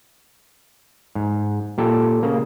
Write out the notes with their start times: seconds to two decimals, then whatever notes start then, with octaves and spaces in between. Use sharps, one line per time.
1.15 G#2
1.78 A#2 G4 A4
2.23 C#3 A#3